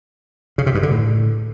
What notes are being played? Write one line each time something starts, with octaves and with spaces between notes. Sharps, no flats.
C#3
C3
G2
D3
A2